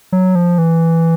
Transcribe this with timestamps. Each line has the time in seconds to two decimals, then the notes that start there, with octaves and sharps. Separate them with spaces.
0.12 F#3
0.35 F3
0.58 E3